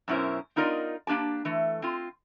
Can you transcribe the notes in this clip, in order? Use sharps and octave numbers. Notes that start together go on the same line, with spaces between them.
F#2 B2 C#4 E4 A#4 C5
B3 D#4 F4 A#4 D5 D#5
A#3 D4 G4 A5
E3 A3
C4 F4